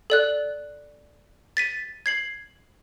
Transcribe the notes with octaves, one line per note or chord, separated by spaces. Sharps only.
A4 D5 F#6
A6 B6 D#7
G#6 C7 F#7